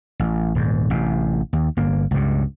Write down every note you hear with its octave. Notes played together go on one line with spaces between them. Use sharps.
A1
D#1 G#2
A1 C3
D#2
G1 A#3
C#2 G2